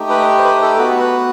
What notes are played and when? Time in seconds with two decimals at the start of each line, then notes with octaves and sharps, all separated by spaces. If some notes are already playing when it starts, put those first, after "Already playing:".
Already playing: A3 D#4 G4
0.10 B4
0.38 C5
0.44 B4
0.62 A4
0.78 B3 F#4 B4
1.00 B4